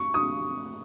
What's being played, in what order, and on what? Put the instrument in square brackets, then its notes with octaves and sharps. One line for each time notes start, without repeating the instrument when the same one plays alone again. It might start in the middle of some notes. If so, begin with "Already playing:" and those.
Already playing: [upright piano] C#6
D#6